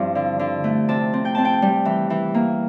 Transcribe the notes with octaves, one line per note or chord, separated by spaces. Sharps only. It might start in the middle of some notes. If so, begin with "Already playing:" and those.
Already playing: G2 F3 C4 E4
D3
D3
A3
C3 A5
C4
G5
C4 A5
G5
G3
E3
E3
A#3